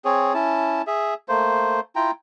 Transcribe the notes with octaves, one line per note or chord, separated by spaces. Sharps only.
C4 G#4 C#5
C#4 E4 A5
G#4 E5
A3 A#3 C5
E4 F4 G5 A#5